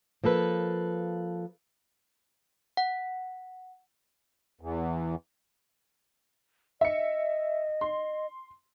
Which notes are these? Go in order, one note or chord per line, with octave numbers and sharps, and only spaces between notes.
F3 A#3 A4 B4
F#5
E2
D#5 E5 C#7
C6